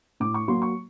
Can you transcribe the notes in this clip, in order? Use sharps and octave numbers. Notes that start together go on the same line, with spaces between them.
A2 D6
C#6
F#3 A#3 C6
C#6